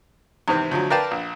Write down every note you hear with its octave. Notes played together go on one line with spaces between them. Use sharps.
E2 G#2 C3 D#3 C4
D2 F3 F#3
A#4 B4 D5 F5 G5 A5
A#1